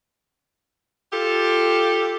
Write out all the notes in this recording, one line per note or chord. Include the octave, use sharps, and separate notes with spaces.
F4 G4 A4